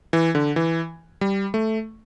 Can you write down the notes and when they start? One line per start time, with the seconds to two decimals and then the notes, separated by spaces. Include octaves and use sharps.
0.13 E3
0.35 D3
0.56 E3
1.21 G3
1.54 A3